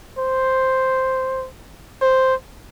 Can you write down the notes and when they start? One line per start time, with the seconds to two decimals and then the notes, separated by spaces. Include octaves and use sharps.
0.18 C5
2.02 C5